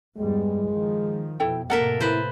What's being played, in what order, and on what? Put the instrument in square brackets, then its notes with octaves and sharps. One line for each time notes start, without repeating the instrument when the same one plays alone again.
[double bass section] E2 G2 G3 [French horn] G#3
[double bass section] D#3 F3
[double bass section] F2 B2 [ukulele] E4 A4 G5
[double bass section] A2 C3 A#3 [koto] A4 A#4 E5 [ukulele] F#5
[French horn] E4 [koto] B4 C5